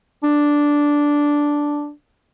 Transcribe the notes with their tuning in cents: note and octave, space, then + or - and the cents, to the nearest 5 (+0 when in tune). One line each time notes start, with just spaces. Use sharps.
D4 -5